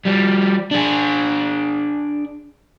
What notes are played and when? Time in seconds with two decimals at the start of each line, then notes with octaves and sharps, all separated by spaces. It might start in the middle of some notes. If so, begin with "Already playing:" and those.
0.05 F3 G3
0.71 D4 G#4